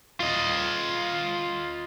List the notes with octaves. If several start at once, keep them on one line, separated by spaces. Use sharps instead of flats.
F4 D#5